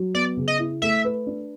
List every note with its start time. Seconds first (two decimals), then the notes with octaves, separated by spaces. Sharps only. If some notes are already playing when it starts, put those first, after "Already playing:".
Already playing: F#3
0.14 B3 D5
0.37 C#3
0.48 D#5
0.59 E4
0.82 A3 E5
1.05 B4
1.27 D4